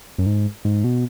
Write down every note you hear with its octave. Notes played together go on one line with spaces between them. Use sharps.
F#2
G#2
G#2
B2